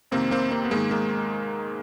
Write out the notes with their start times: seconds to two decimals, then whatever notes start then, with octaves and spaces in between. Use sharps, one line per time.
0.11 F2 C3 D#3 A#3 C4
0.31 A#3 C4
0.52 A#3 C4
0.65 B3
0.71 G#2 D#3 G#3 A#3
0.91 G#3 A#3